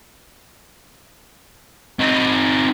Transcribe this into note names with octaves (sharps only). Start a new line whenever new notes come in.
C4 D#4